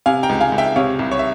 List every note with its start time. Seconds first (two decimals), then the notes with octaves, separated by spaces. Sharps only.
0.06 C3 F5 G#5
0.23 G5 A#5
0.29 C#2
0.41 F5 G#5
0.52 C#2
0.58 E5 G5
0.76 C3 C#5 F5
0.99 C2
1.11 C#5
1.19 E5